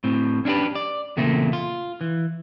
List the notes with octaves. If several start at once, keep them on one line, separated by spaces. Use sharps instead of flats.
A2 C4
C#4 D4 E4 G4 B4
D5
E2 A#2 C#3 A3 A#3 C4
F4
E3